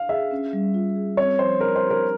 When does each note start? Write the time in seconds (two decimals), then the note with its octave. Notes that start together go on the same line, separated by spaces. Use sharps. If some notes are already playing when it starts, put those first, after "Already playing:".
Already playing: F5
0.09 G#4 E5
0.31 C#4
0.53 G3
0.74 F4
0.96 G#4
1.17 C4 C#5
1.39 F3 C5
1.61 E4 A#4
1.76 C5
1.83 G4
1.91 A#4